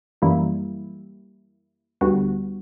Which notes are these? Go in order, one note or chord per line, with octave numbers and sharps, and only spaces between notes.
F#2 E3 G3 A#3 E4
D2 D3 G3 B3 F#4